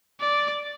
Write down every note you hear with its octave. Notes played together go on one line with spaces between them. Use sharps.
D5